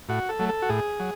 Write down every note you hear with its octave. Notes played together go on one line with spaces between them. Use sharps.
A2 F#4
A4
F#3 A3
A4
F#4
A2 G#4
F#3